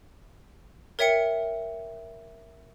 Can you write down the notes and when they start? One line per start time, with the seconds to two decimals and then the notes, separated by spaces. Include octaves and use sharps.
0.99 A#4 C#5 E5 G5 C#7